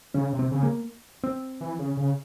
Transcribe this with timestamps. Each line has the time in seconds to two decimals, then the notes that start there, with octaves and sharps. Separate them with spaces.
0.14 C#3 C#4
0.33 C3
0.39 C4
0.51 C#3
0.63 A#3
1.24 C4
1.61 E3
1.79 C#3
1.97 C#3